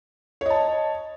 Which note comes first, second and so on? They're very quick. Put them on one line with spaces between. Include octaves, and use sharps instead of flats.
C#5 D#5 A5